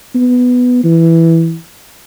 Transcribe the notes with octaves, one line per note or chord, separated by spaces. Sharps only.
B3
E3